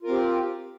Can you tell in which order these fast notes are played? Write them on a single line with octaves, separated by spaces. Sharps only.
F4 A#4 C4 G4